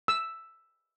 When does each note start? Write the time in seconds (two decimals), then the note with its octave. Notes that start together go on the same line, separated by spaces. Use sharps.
0.08 E6